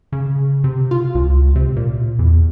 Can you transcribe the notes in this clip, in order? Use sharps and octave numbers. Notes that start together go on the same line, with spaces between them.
C#3
C3
F4
C#2
C3
A#2
E2